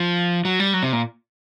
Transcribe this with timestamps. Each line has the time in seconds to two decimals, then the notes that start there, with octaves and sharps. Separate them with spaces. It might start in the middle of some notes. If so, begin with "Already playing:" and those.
Already playing: F3
0.45 F#3
0.60 G3
0.74 F#3
0.83 C3
0.93 A#2